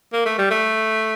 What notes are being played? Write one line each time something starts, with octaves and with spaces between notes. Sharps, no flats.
A#3
A3
G3
A3